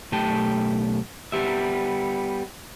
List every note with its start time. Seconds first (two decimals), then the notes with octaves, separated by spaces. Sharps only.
0.12 B1 A3 G4 G5 A5
1.32 G3 B3 G4 E5